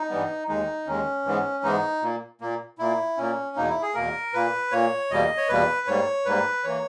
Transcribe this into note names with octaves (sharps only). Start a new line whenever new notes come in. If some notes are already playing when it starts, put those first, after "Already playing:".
Already playing: D#4
G2 E3 G3 B3
D#2 D#3 G#3 D#4
D#2 D#3 G#3 C#4
G#2 E3 G#3 B3
G#2 E3 G#3 B3 D#4
A#2 A#3
A#2 A#3
A#2 A#3 E4
A#2 A#3 C#4
E2 B2 A#3 D#4
E4
G#4
E2 B2 A#3 A#4
A#2 A#3 B4
A#2 A#3 C#5
E2 B2 G3 A#3 D#5
C#5
E2 B2 G3 A#3 B4
G#2 G3 A#3 C#5
G#2 G3 A#3 B4
E3 A#3 C#5